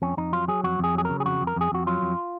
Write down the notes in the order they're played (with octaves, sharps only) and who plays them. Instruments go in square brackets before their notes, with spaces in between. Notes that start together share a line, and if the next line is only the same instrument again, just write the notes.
[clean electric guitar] F2 C#4
F2 D#4
F#3 F4
F#3 G#4
F2 F#4
F2 G#4
F#3 G#4
C#3 A#4
G#4
F2 F#4
F2
A#4
F2 G#4
F2 F#4
F#3 F4
F2